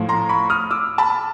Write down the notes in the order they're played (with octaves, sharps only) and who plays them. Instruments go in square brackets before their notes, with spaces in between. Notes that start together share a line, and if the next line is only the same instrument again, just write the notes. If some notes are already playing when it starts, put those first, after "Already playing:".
Already playing: [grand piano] A2 F3
A#5 C6
B5 C#6
D#6 F6
D6 E6
A5 B5